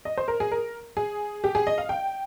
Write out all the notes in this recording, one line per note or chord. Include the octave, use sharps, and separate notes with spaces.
D#5
C5
A#4
G#4
A#4
G#4
G4
G#4
D#5
F5
G5